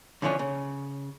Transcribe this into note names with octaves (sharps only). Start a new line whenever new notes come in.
F2 D3 E3 F3 C#4 D4
C#3